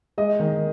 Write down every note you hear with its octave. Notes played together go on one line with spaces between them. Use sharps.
G#3 D#5
D#3